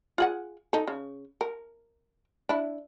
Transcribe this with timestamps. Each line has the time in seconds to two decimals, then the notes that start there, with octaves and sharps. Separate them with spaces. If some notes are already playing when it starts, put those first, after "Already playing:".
0.18 F4 G#4 F#5
0.73 D#4 A4
0.87 C#3
1.41 A#4
2.49 D4 E4